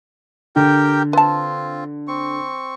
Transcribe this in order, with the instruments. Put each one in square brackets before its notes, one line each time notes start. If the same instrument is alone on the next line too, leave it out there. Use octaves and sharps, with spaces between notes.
[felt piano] D3 [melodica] G4 A#4 G5
[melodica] C4 F4 [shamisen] B4 A5
[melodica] C4 C#6